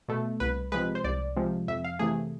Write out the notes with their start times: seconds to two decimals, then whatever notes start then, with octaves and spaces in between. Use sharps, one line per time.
0.08 B2 A3
0.40 C2 B4
0.72 C3 F3 G#3 B4
0.95 C5
1.04 C2 D5
1.36 C3 F3 G#3
1.68 F2 E5
1.84 F5
1.99 C3 E3 A3 G#4